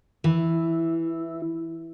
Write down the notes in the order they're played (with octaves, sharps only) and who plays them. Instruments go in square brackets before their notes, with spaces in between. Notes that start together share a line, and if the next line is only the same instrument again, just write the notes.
[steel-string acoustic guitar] E3 [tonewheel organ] E4